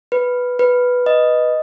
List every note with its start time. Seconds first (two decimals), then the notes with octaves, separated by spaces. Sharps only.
0.12 B4
0.59 B4
1.06 D#5